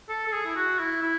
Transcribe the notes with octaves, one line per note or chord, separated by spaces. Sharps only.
A4
A4
G#4
E4
F#4
E4
E4